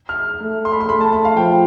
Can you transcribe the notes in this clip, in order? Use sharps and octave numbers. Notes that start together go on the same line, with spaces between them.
F6
A3
C6
B5
C6
A3 B5
A5
B5
F5
F3 G5